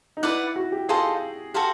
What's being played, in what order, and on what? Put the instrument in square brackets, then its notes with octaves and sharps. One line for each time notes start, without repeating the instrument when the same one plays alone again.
[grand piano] D#4
[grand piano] E4 [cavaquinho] B4 D5 F#5
[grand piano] F#4
G4
[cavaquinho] F4 A4 C5 D#5 [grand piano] G#4
[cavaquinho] F#4 A4 C5 F5 [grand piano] G4